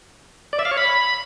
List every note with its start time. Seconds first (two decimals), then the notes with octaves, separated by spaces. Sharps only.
0.53 D5
0.59 E5
0.65 F5
0.71 C#5
0.78 B5